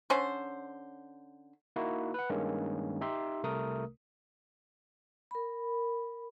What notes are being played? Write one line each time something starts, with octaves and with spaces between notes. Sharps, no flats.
D3 C#4 C5
A#3 D#4 E4 F#4
B4 F#5
G2 D#3 G#3 A#3 C#4
D#4 G4 E5 C6
C2 C3 A3 A#4 D#6
A#4 B5